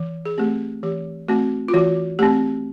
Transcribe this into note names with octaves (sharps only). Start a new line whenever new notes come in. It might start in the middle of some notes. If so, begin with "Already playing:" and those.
Already playing: E3
G#4
A3 C4 G4
E3 G4
A3 C4 F#4
F4
E3 F#4
A3 C4 G4